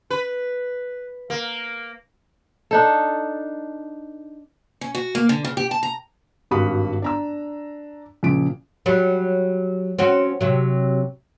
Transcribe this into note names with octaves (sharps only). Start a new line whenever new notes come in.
B4
A#3
D4 D#4 A4
C#4
F#4
A#3
D3
C#3
G4
A5
A#5
G#1 G2 F#4 F5 B5 D#6
D4 A#5 E6
A#1 C#3 D7
F#3 G3
C4 C#4 F#4
C3 F#3